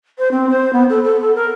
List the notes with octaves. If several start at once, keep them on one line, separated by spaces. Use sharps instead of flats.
C5
C4
C5
B3
A4
A4
A4
A#4